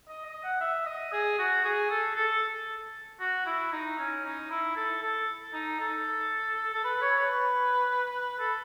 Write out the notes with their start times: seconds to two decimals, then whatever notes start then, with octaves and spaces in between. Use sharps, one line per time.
0.09 D#5
0.25 D#5
0.44 F#5
0.61 E5
0.86 D#5
1.12 G#4
1.38 F#4
1.65 G#4
1.90 A4
2.16 A4
3.20 F#4
3.46 E4
3.73 D#4
3.99 C#4
4.24 D#4
4.50 E4
4.76 A4
5.02 A4
5.53 D#4
5.80 A4
6.74 A4
6.84 B4
7.01 C#5
7.18 B4
8.39 A4